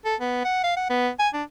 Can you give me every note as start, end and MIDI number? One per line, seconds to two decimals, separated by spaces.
0.05 0.15 69
0.21 0.43 59
0.45 0.59 78
0.64 0.73 77
0.77 0.86 78
0.90 1.09 59
1.19 1.28 80
1.34 1.43 62